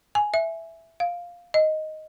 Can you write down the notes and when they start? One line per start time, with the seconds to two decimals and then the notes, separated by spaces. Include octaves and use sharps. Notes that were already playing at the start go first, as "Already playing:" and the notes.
0.15 G#5
0.34 E5
1.00 F5
1.54 D#5